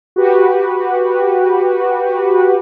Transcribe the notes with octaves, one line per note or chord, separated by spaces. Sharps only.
F#4 G4 B4